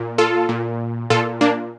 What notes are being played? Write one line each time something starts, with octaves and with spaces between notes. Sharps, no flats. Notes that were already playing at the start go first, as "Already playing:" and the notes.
Already playing: A#2
F4 A4
A#2
A#2 F4 A4
A#3 D4